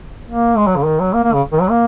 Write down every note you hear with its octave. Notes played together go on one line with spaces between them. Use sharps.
A#3
G#3
F#3
C#3
D#3
F#3
A#3
A#3
C#3
D#3
F#3
A#3